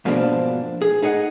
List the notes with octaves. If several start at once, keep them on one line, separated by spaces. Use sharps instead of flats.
G#2 B2 F3 A#3 C4 D4
G#4
D#4 G#4 D#5 F#5